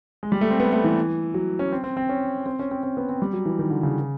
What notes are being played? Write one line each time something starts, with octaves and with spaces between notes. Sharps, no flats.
G#3
G3
A3
C4
B3
A3
E3
F#3
C#4
C4
C4
C4
C#4
C4
C#4
C4
C4
B3
C4
G3
F#3
E3
D#3
D3
C#3